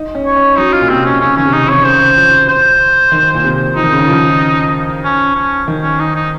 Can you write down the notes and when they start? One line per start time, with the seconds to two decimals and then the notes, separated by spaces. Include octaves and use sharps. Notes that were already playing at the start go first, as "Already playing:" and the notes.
Already playing: D#4
0.15 C#4
0.26 C#5
0.36 C#4
0.57 F#3 D#4
0.73 F4
0.81 A#2
0.89 C3 C4
1.06 C#4
1.21 C#3 C#4
1.37 D#3 C#4
1.46 C3
1.53 C#3 D#4
1.69 C3 C#5
1.77 D#3
1.85 C#3 C5
2.17 F3
2.48 C5
3.12 D#3
3.34 A#2
3.44 C3
3.76 F3 D#4
3.84 D#3
3.92 C#3
4.00 D#3
4.08 F3
5.04 C#4
5.35 C#4
5.68 D#3
5.83 C#4
6.00 D#4
6.16 D#4